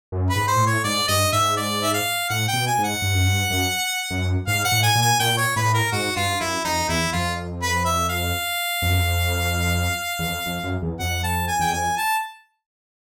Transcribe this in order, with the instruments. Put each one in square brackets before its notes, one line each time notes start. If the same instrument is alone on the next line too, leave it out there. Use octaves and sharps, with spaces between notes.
[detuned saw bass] F#2
[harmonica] B4
[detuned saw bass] G#2
[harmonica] C5
[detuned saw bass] A#2
A2
[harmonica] C#5
[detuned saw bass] G#2 [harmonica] D5
[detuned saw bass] G2 [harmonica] D#5
[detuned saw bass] G#2 [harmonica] E5
[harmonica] D5
E5
F5
[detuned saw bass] A2 [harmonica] F#5
[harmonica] G5
[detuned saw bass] B2
[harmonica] G#5
[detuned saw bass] G#2
[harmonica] F#5
[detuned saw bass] G2
F#2
G2
F#2
F#2
[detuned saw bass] G#2 [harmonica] F5
[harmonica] F#5
[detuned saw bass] A2
[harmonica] G#5
[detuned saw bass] A#2
[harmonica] G#5
[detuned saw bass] A#2 [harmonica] G5
[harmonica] C#5
[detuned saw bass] A2 [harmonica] B4
[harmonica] A#4
[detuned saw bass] G#2 [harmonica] F#4
[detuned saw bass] G2 [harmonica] F4
[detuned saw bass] F#2 [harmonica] E4
[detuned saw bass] F2 [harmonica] D#4
[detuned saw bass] E2 [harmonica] E4
[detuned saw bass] F2 [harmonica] F4
[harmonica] B4
E5
F5
[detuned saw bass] F2
F#2
F2
E2
F2
F2
F#2
E2
[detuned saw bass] F2 [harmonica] F#5
[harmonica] A5
G#5
[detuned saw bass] E2 [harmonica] G5
[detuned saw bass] F2 [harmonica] G#5
[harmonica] A5